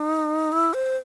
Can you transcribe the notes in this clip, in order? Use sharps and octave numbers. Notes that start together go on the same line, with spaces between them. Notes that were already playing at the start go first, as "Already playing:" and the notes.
Already playing: D#4
E4
C5